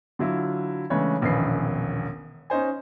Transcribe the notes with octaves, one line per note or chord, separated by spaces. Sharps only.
D3 F#3 E4 F4
C#3 E3 G#3 A3 D4 C#5
E1 A#1 D#3 C#4 B4 C7
C#4 D#4 C5 G#5